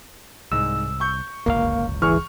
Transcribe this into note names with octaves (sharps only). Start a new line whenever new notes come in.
C2 G#2 E6
C#6 G6
D1 G1 C#2 A#3 F5
E3 G#4 C#6 F6